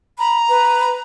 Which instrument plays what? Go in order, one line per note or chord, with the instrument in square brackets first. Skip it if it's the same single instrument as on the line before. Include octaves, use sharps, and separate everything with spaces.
[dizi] A#5 [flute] B5
[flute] B4